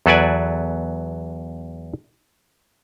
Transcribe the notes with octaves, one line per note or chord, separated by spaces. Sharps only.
E2 F#3 A4 B4 D5 G#5